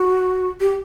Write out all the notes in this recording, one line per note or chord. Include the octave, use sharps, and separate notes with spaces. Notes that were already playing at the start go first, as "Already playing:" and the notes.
Already playing: F#4
G4